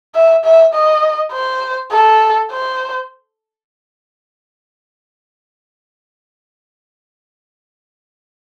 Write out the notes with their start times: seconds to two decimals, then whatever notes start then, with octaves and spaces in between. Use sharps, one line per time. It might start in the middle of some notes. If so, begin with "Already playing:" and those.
0.15 E5
0.45 E5
0.74 D#5
1.33 C5
1.92 A4
2.51 C5